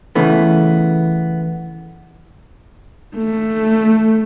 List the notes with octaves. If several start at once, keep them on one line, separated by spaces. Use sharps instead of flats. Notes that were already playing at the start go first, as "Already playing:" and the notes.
C#3 E3 A3 B3
A3